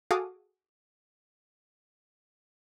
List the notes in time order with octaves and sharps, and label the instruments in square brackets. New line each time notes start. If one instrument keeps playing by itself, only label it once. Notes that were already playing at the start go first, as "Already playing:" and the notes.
[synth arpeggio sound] F#4 G#4 A4 F5 D6 D#6